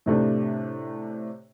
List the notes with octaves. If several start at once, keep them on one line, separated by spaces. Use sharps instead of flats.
A2 C3 A3 D4